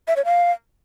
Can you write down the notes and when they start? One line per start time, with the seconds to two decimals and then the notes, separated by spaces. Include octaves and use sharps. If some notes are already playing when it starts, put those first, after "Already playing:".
0.08 E5
0.16 C#5
0.25 F5